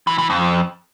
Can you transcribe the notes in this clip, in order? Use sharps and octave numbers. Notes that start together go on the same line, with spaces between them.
E3
E3
F2